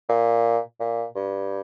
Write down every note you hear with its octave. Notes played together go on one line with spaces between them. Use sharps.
A#2
A#2
G2